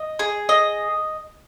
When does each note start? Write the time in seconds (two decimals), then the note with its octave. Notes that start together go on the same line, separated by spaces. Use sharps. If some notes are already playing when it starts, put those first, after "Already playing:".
Already playing: D#5
0.19 G#4
0.49 D#5